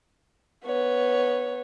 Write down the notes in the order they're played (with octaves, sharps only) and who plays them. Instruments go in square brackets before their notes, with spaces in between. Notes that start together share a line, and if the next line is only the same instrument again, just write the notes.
[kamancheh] B3 C#5